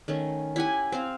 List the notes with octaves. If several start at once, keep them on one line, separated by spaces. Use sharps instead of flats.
D#3 A3 C#4
E4 G4 F#5 G#5
C4 C5 F5